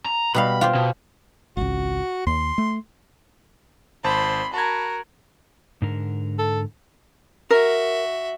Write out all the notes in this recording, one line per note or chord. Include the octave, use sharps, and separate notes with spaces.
A#5
B2 G3 F5 B5
F4 G4 C5
B2
G#1 C#2 F#4
D#2 C6
A3
G#1 C5 A5 B5 C6
F#4 A#4 A5 B5 G#6
G#2 D3 A#4
A4
F#4 A#4 E5